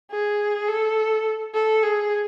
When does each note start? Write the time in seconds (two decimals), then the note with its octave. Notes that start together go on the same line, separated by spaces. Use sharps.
0.11 G#4
0.68 A4
1.54 A4
1.83 G#4